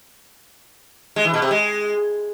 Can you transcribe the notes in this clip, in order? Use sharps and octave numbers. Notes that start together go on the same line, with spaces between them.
G#3
E3
B2
C3
G#3